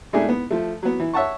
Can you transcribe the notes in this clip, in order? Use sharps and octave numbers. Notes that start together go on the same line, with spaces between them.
B2 G#3 A3 D4 D#4 G#4
B3
F3 A3
F#3 B3
E3
C#5 E5 F#5 A5 C#6